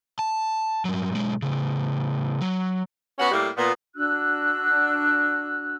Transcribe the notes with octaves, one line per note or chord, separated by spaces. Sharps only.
A5
G2 F#3
B1 G#3
A2 C#3
F#3
B3 C#4 F#4 F#5
A2 G3 A#3
A#2 B3
D4 F#4 E6 F#6